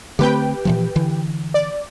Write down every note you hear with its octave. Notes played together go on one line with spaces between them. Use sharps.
D3 A3 C4 G4 B4 G5
A#2 E3 F3
D3 E3
D5